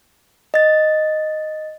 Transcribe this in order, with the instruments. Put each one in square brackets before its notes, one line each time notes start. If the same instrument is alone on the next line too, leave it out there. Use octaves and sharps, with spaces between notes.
[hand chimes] D#5 A6